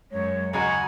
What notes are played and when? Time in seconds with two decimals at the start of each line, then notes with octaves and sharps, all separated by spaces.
0.12 F#2 G#3 C#5
0.53 D#2 C#3 G#3 F#4 F#5 G#5 A#5